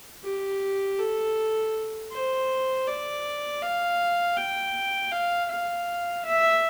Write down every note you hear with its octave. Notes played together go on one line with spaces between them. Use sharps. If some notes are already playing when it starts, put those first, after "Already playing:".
G4
A4
C5
D5
F5
G5
F5
F5
E5